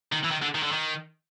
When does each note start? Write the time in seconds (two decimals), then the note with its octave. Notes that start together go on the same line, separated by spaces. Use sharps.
0.12 D#3
0.24 E3
0.31 D#3
0.42 D3
0.55 D#3
0.63 D3
0.72 D#3